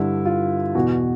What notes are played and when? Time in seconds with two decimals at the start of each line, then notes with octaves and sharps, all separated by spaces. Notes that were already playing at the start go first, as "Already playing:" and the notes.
Already playing: G2 D3 E4
0.25 F4
0.75 E2 B2 F#4